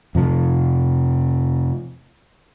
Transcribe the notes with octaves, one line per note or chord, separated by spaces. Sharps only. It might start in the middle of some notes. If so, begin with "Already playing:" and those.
F2 C3 F3